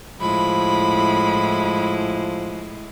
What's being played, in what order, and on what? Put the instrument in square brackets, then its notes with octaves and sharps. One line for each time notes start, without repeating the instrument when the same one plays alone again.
[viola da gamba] A2 G#3 E4 [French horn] F3 [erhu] B5